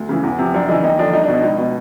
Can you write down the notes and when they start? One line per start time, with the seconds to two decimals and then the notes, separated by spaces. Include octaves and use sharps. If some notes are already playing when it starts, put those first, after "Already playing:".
Already playing: D2
0.09 C#3 E3
0.23 E2
0.39 C3 F3
0.54 F#2 D4
0.68 C#3 E3 D#4
0.83 D#2 D#4
0.99 D3 F3 D4
1.13 C2 D#4
1.24 D4
1.28 B2
1.34 D#4
1.44 C#2 D#4
1.58 B2